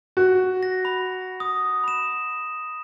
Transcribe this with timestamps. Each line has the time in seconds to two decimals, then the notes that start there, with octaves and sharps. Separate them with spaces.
0.17 F#4
0.63 A#6
0.85 B5
1.40 D#6
1.84 B5 E7